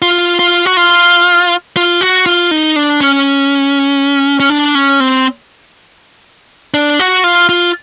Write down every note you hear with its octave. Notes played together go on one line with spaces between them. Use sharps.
F4
F4
F#4
F4
F4
F#4
F4
D#4
D4
C#4
C#4
D4
C#4
C4
D4
F#4
F4
F4